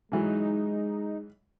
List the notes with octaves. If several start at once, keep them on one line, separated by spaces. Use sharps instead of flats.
G#2 E3 F#3 G#3 D#4